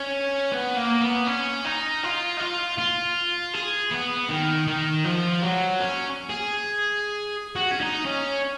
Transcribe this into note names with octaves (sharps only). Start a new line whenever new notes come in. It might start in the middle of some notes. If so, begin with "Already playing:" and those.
Already playing: C#4
B3
A#3
B3
C#4
D#4
F4
D#4
F4
F4
G#4
B3
D#3
D#3
F3
F#3
C#4
G#4
F#4
C#4
D#4
C#4